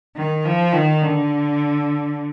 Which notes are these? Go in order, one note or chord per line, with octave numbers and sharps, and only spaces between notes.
D#3
F3
D#3
D3